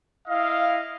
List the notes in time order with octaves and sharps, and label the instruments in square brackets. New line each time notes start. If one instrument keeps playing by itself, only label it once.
[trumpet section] E4 D#5 F5